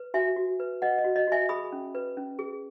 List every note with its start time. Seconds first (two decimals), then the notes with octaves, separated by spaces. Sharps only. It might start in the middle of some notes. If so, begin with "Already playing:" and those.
Already playing: B4
0.14 F#4 E5 G#5
0.36 F#4
0.60 B4
0.82 B4 D#5 F#5
0.98 D#5
1.04 F#4
1.16 D#5
1.27 F#4 E5 G#5
1.49 G#4 B5 D#6
1.72 C#4
1.95 B4
2.17 C#4
2.39 G#4